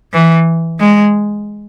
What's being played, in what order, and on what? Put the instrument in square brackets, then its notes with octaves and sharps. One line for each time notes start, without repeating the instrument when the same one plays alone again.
[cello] E3
G#3